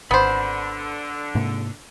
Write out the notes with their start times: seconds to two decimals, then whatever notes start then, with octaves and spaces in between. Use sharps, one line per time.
0.11 G#1 D3 B3 C5 B5
1.35 G#2 C3 A#3